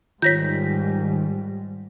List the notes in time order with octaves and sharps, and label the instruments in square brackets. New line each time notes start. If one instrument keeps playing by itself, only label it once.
[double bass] G#2 G3 [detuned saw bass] D#3 [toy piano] F4 C#5 [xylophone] G6 A#6 B6